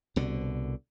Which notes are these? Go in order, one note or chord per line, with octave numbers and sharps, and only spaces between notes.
C2 B2 D3